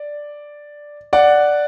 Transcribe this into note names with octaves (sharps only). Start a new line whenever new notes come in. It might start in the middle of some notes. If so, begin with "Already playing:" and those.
Already playing: D5
D5 F#5